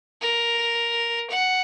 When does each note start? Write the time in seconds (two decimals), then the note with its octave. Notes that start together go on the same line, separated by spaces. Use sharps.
0.22 A#4
1.30 F#5